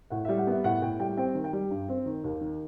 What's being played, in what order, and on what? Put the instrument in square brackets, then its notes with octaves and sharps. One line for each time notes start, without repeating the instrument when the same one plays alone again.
[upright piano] A2 F#5
G3 E5
F#5
B3 E5
A2 F#5
A2 G5
G3 G5
C4 G5
D#3
G5
G3
G2
C4
D#3
D#2
D#3